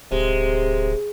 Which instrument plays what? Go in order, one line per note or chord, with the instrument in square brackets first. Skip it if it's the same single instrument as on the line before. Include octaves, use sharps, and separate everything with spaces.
[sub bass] D1 [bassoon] C3 [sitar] G#3